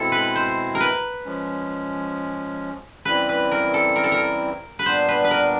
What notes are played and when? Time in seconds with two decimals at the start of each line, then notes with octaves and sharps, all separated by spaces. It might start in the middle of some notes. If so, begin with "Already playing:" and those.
Already playing: B2 G#3 C4 E4 A4
0.12 B4
0.36 C5
0.75 A#4
0.80 B4
1.25 F3 G#3 C#4
3.05 C#3 E3 G3 C4 E4 B4
3.29 B4
3.51 A#4
3.74 A4
3.96 A#4
4.04 A4
4.12 A#4
4.79 B4
4.86 A#2 G3 B3 D4 C5
5.09 B4
5.24 B4
5.31 A#4